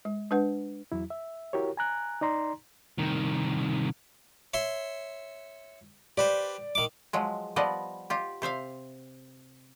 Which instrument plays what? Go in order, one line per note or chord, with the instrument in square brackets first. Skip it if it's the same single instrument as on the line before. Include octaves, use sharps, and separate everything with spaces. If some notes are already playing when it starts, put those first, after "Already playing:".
[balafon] G#3
G#3 D4 B4 F#5
[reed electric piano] E2 F#3 E4
E5
E4 F#4 G4 A#4 C#5
G#5 A#5 F#6
D#4 D5 A#5 C6
[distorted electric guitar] C2 D#3
[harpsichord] C#5 E5 C6
[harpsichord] G4 B4 C5 [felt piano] D5
[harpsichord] D#3 D6
[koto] F3 F#3 G#3
F3 G3 B3 D5 D#5
F4 G4
C3 C5 E5 F5